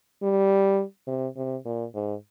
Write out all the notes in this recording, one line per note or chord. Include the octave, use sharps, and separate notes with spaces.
G3
C3
C3
A#2
G#2